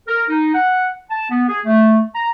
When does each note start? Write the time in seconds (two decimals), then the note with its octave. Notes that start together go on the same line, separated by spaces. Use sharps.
0.07 A#4
0.29 D#4
0.54 F#5
1.10 A5
1.30 B3
1.49 G#4
1.65 A3
2.15 A#5